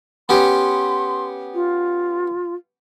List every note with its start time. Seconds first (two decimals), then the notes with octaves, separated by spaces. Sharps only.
0.29 B3 C#4 G4 C6
1.54 F4